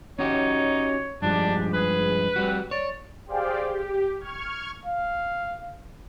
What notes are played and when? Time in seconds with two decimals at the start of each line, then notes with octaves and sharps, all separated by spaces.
0.19 C#4 D#4 F#4 G4 C#5
1.22 G2 F3 G#3 D4 G4
1.74 G#4 B4
2.36 G3 C4 F#4
2.71 C#5 D5
3.26 G4 G#4 C5 D5 F5 G5
3.66 G4
4.19 C#6 F6 G#6
4.86 F5